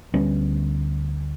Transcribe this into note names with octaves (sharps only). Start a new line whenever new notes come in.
D2 G3 B3 C#4